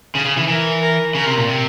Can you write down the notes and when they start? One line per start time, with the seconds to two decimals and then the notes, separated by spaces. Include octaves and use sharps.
0.15 C#3 G#4
0.25 C#3
0.37 E3
0.48 E3 A#4
0.81 A#4
1.15 C#3 A#4
1.26 C3
1.37 A#2
1.49 C3